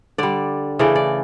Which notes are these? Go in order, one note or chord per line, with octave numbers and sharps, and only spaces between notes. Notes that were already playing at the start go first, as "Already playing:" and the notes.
D3 G3 D5
C#3 E3 A3 D5
D5